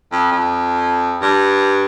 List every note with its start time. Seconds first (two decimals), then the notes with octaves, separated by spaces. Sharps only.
0.12 F2
0.31 F2
1.22 G2